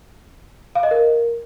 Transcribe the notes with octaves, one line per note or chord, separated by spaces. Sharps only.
F5
D#5
A#4